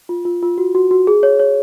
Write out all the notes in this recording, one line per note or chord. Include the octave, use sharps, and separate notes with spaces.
F4
F4
F4
F#4
F#4
F#4
G#4
C#5
C#5